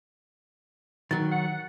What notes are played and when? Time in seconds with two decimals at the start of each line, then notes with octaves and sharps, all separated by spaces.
1.11 D#3 F#3 A6
1.31 F#5